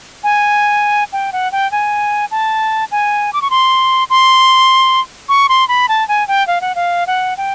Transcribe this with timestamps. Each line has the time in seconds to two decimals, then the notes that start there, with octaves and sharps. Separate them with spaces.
0.24 G#5
1.13 G5
1.33 F#5
1.52 G5
1.72 G#5
2.31 A5
2.91 G#5
3.33 D6
3.42 C#6
3.50 C6
4.10 C6
5.29 C#6
5.49 C6
5.68 B5
5.89 A5
6.08 G#5
6.28 G5
6.47 F5
6.61 F#5
6.75 F5
7.07 F#5
7.37 G5